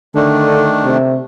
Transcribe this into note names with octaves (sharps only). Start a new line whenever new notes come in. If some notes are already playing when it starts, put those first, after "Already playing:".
D3 D#3 A3 D4
C3